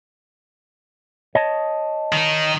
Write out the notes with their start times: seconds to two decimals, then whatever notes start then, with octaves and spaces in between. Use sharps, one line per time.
1.35 C#5 D#5 A5
2.12 D#3 D#4